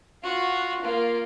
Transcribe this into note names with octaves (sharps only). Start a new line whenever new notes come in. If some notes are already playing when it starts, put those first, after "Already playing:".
F4 F#4
A#3 F4